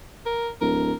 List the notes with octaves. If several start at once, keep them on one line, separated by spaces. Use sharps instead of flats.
A#4
D1 A#4